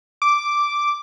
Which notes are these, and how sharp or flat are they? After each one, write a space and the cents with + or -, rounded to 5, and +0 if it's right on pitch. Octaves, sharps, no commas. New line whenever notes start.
D6 -5